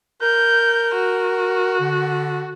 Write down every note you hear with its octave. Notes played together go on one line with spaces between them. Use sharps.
A#4 G6
F#4
D3